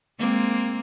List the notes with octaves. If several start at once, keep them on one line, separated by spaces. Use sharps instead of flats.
G#3 A#3 C4